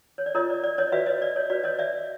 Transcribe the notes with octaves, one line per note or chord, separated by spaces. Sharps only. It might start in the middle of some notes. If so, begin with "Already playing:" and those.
C#5
D5
F4 A#4 C#5 D#5
D5
D5
C#5 D#5
F#4 B4 D5 E5
C#5 D#5
D5
C#5
F#4 B4 D5
C#5 D#5
D5 E5